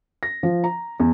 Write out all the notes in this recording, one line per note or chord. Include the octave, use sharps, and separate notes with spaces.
A#6
F3
A#5
E2